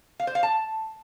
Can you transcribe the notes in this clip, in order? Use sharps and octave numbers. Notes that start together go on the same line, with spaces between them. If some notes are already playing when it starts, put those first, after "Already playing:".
F5
C5
F5
A5